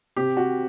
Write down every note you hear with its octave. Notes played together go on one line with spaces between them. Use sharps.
C3 G4
F#4